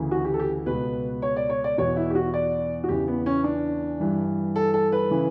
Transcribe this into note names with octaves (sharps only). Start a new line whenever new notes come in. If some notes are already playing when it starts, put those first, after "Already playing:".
Already playing: D2 C#3 E3
F#4
G4
A4
G4
C#2 B2 B4
C#5
D5
C#5
D5
E2 B2 C#5
E4
G4
F#4
D5
F#4
E2 C#3 E3 G4
B3
C#4
D4
G2 E3
A4
A4
B4
C#3 E3